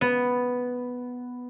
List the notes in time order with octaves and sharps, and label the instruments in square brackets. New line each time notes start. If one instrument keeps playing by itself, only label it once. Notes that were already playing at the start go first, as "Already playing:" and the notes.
[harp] B3